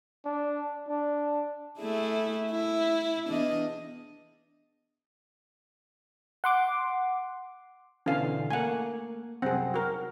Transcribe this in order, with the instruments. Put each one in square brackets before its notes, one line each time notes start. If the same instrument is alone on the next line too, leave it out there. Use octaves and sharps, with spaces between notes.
[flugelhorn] D4
D4
[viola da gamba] A3 E4 G#4
E4
E2 D4 D#5
[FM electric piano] F#5 C6 D6
[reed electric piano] B2 D3 E3 [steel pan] C#4 F5
[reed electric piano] A3 A#3 [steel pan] F#5 G#5
[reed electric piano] C2 F#2 F#5 [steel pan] C4 G#4
[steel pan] F#4 A#4